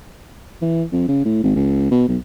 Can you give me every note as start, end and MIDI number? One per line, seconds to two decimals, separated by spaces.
0.62 0.83 52
0.92 1.08 41
1.08 1.20 49
1.25 1.41 45
1.43 1.51 32
1.56 1.89 37
1.91 2.05 47
2.08 2.17 35